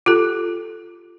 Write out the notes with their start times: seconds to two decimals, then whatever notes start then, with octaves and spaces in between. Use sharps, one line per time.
0.06 F4 G4 A4